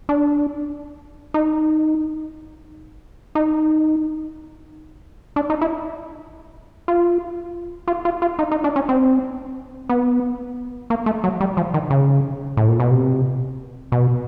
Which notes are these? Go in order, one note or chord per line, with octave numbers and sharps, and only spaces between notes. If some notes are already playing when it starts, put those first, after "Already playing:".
D4
D#4
D#4
D4
D#4
E4
F4
F4
F4
F4
D#4
D#4
D4
C#4
C4
B3
A#3
A3
F#3
G3
F3
D#3
C#3
A2
A#2
B2
C3
B2